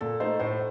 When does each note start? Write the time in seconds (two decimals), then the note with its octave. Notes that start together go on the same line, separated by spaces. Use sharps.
0.01 A#2 A4
0.20 A3 D#4 C5
0.39 A2 C5